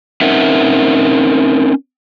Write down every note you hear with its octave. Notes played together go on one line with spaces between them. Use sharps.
C4 C#4 D#4 A#4 E5 F#5